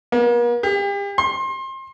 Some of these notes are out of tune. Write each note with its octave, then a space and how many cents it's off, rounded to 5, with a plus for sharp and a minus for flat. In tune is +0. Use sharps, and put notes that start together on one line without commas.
A#3 +45
G4 +40
C6 +30